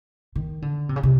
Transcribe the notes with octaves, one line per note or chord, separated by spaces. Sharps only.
D#3
D3
C3
C#3
C3